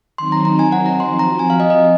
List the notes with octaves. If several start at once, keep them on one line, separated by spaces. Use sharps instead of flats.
D#3 F#3 C4 D#4 C6
A#5
A#5
G#5
F#5
A#5
F3 C4 F#4 C6
A#5
G#5
F5
D#5
D#5